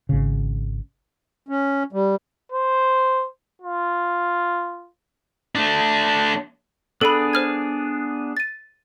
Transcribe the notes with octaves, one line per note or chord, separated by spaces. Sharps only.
G#1 C#3
C#4
G3
C5
F4
A3 D4
B3 D4 G#4 A4 B5
C5 F6 G#6
A6 D#7